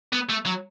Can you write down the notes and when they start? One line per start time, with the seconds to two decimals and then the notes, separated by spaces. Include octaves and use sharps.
0.13 B3
0.30 A3
0.46 F#3